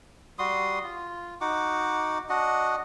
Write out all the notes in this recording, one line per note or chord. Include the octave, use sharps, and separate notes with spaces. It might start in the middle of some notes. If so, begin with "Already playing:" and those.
G3 F#4 C6 D#6
F4
D#4 F#4 F#5 D6
D4 F#4 D#5 F#5